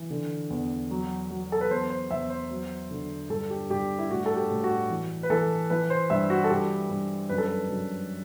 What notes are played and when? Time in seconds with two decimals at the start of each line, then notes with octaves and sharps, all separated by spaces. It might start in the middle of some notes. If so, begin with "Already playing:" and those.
Already playing: E3
0.10 D3
0.50 E2
0.91 F#3
1.31 F#3
1.52 A4
1.61 B4
1.71 E2 C5
1.90 C5
2.11 E2 E5
2.30 C5
2.51 F#3
2.91 D3
3.30 G2 A4
3.50 G4
3.70 G2 G4
3.99 E4
4.10 A2 F#4
4.26 A4
4.36 G4
4.50 A2
4.64 F#4
4.90 E3
5.23 B4
5.30 E3 A4
5.70 E3 B4
5.90 C5
6.10 G2 E5
6.30 F#4
6.44 A4
6.50 G2 G4
6.90 G2
7.29 F#2 B4
7.38 A4
7.46 B4
7.70 F#2